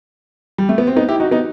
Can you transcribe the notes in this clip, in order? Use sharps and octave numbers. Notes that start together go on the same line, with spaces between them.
G3
A3
B3
C4
B3 D#4
E4 G4
D#4 F#4
B3 D#4